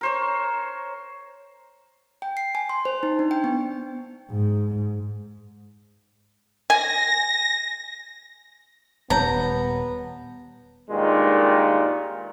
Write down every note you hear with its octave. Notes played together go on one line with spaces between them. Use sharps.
A#4 C5 C#5
G5
C7
G#5
C6
C5
D#4
D4
G5
B3
G#2
G#5 A#6
D#1 G3 B3 C#5 A5 A#5
G2 A#2 D#3 G#3